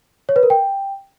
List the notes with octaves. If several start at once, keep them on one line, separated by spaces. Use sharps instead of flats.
C#5
B4
A#4
G5